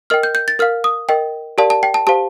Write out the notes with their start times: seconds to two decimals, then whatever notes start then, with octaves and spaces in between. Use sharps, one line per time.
0.10 A#4 D#5 G5 F6
0.23 G6
0.35 G6
0.48 A6
0.59 A#4 F5 F6
0.84 D#6
1.09 A#4 D#5 G5
1.58 G4 A#4 D5 F5 A5
1.70 A5
1.83 G5
1.94 A5
2.07 G4 C5 F5 A5